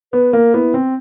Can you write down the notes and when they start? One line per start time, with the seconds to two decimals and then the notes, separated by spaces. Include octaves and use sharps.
0.13 B3 B4
0.33 A#3 A#4
0.54 B3 E4
0.74 C4